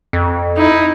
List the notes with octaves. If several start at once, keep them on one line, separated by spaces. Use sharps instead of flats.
F2
D#4 E4